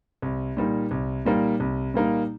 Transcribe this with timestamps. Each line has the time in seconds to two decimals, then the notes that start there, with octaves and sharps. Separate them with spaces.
0.22 C2
0.57 A#2 G3 A#3 D#4
0.91 C2
1.25 A#2 G3 A#3 D#4
1.60 C2
1.94 A#2 G3 A#3 D#4